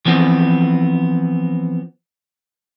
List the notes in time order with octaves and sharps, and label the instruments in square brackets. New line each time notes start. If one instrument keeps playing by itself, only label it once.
[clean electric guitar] E3 F3 B3 C4